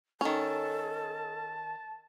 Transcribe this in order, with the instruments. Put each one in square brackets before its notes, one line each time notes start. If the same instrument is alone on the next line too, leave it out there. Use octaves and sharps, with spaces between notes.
[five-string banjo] D#3 C#4 [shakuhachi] A4 [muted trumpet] A5